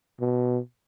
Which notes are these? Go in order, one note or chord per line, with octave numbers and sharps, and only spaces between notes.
B2